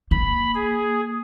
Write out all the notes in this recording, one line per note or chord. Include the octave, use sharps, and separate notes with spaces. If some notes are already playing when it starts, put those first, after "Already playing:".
A#3 B5
G#4